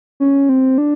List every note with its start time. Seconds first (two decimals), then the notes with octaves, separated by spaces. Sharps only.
0.20 C#4
0.49 C4
0.78 D4